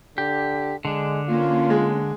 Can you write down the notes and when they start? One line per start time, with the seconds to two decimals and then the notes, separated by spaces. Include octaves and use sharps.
0.18 D3 G4
0.85 D3 G#3 D4
1.28 A#3 C#4 F4
1.70 G#3